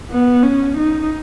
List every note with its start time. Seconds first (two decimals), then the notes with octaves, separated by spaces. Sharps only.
0.10 B3
0.43 C#4
0.78 D#4